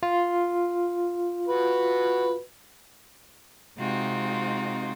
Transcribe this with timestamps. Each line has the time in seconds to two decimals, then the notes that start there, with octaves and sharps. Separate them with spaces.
0.03 F4
1.48 F#4 B4
3.78 C3 G#3 C4 D#4 F4 F#4